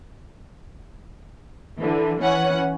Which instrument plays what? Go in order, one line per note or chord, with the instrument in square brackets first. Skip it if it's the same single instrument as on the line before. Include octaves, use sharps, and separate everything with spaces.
[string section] D3 E3
E3 C#4 F#5